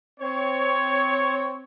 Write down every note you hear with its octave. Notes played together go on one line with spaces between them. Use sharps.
C4 C#5